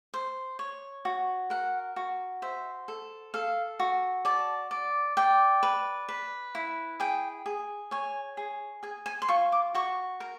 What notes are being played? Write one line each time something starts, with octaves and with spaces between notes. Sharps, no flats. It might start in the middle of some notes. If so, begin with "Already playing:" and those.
C5
C#5
F#4
A#4 F#5
F#4
C5 E5
A4
A4 F5
F#4
D5 A5
D5
D5 G5
B4
B4
E4
G#4 G5
G#4
C#5 G#5
G#4
G#4 G#5
G#5
C6
F4 C#6
D6
F#4 C#6
A#4